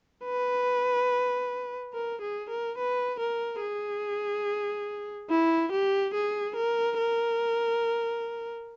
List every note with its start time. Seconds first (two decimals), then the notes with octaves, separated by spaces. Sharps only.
0.25 B4
1.94 A#4
2.21 G#4
2.49 A#4
2.78 B4
3.19 A#4
3.61 G#4
5.30 E4
5.72 G4
6.14 G#4
6.56 A#4
6.98 A#4